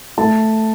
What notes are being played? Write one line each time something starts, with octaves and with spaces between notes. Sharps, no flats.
A3 A5